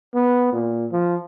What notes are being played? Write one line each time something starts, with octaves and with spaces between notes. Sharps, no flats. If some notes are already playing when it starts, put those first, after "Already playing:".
B3
A#2
F3